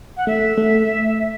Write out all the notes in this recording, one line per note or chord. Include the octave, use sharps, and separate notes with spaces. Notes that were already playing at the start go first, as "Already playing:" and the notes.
F#5
A3 E5
A3